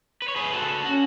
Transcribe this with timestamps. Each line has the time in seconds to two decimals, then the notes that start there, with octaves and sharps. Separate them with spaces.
0.22 B4
0.28 C#5
0.36 G#4 B4
0.53 F#4 A4
0.85 C#4 F#4